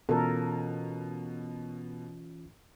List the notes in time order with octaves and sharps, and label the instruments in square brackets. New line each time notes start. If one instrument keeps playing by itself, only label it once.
[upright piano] B2 [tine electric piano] E3 C#4 F4 [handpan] A4 A#4